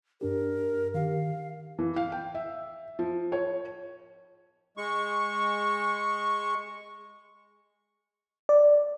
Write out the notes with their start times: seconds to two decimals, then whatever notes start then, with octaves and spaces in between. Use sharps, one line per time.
0.21 G2 D4 G4 A#4
0.94 D#3 G4 F5
1.79 E3
1.96 F5
2.12 G5
2.35 E5
2.99 F3
3.32 C#5
4.77 G#3 C#6
8.49 D5